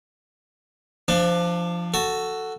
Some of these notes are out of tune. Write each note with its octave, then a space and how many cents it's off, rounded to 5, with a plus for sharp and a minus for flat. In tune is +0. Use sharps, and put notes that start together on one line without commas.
F3 -10 D4 +20
F#4 +0 A4 +10